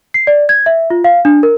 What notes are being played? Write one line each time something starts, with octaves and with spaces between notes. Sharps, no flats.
C7
D5
G#6
E5
F4
F5
D4
A#4